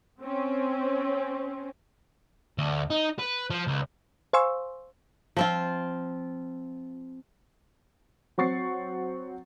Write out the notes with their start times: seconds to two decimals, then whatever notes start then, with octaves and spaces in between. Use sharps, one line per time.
0.22 C4 C#4
2.58 D2
2.90 D#4
3.19 B4
3.50 F3
3.67 C#2
4.33 C5 F5 G#5 C6 C#6 E6
5.36 F3 C4 F4
8.38 F#3 C4 F#5 C#6 A6 C7